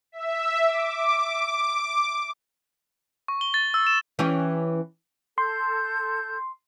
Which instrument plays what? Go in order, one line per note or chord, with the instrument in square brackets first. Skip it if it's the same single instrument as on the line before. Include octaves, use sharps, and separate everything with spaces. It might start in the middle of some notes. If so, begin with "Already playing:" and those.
[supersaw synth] E5
D6
[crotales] C#6
G7
A6
E6
E7
[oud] E3 C#4 G4
[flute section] A4 G6 [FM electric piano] C6